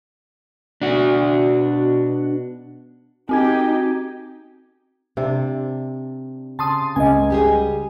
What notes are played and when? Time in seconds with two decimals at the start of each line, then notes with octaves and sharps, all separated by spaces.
0.82 B2 D4 F#4
3.29 C4 D#4 F#4 G4 G#6
5.17 C3 D4
6.59 C#3 A5 C6 D#6
6.96 C#2 D#5 G#5
7.30 G3 G4 G#4